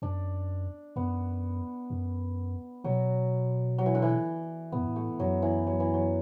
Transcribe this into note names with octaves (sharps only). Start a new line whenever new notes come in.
F#2 D4
F#2 B3
F#2
B2 F#3
F#3
E3
D3
E3
A2 B3
F#2
A2
A3
F#2 F#3
E3
F#3
E3
F#3